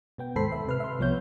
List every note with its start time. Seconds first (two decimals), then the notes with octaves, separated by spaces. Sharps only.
0.18 B2 B3 G5
0.36 D#2 G#2 A4 C5 B5 C7
0.52 E5
0.67 C3 B4 F6
0.80 E5 C6
0.99 C2 F3 B3 C#5 G6